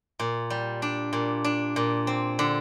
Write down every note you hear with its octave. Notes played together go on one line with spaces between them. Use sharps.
A#2
G3
D4
A#2
D4
A#2
C4
D3